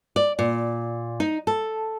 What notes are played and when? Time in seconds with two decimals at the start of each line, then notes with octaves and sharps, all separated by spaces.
0.16 D5
0.39 A#2
1.20 D#4
1.47 A4